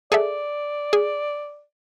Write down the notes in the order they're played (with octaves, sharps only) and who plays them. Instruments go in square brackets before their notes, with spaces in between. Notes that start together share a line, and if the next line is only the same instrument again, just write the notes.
[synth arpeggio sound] G#4 A4 E5 [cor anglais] D5
[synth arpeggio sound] G#4